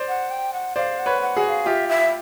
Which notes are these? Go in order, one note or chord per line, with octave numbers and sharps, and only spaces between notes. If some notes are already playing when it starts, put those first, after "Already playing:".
Already playing: C5 D5
F#5
G5
F#5
C5 D5 F5
F#5
B4 C#5
F#5
F#4 G#4
F#5
F5
F4 G4 E5
E5